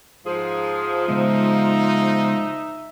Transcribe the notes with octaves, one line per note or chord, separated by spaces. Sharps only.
G#2 F3 G#4
C#3 G#3 B3 D#4 E5